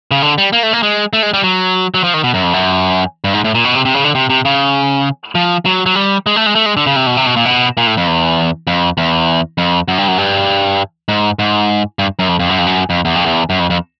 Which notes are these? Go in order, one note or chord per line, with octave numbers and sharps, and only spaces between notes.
C#3
D3
G3
A#3
A3
A#3
G#3
A3
G#3
G3
F#3
F#3
F3
D#3
B2
F#2
F2
F#2
G2
G#2
A2
A#2
B2
C3
C3
C#3
D3
C3
C3
C#3
F3
F#3
F#3
G3
G#3
A3
G#3
A3
G#3
D3
C#3
C3
B2
C3
B2
A#2
B2
A#2
A2
F2
E2
F2
E2
F2
F#2
G2
F#2
G2
G#2
G#2
G2
F#2
F2
F2
F#2
F2
F#2
F2
E2
F2
E2
F#2
F2
F2